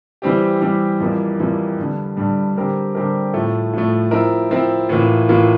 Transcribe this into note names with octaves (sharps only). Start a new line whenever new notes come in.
E3 G3 C4 G4
E3 G3 C4 G4
F2 E3 G3 A#3
F2 E3 G3 A#3
G2 D3 G3
G2 D3 G3
D3 G3 C4 G4 A#4
D3 G3 C4 G4 A#4
A2 F3 A3
A2 F3 A3
F3 C4 E4 A#4
F3 C4 E4 A#4
A2 E3 A#3 F4
A2 E3 A#3 F4